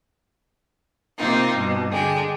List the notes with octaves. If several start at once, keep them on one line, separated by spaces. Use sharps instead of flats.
C3 A#3 C4 D#4 F4
G2 B2
D3 G#3 G5